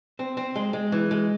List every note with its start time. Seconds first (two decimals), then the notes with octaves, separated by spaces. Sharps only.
0.19 C4
0.37 C4
0.56 G#3
0.73 G#3
0.92 E3
1.11 G#3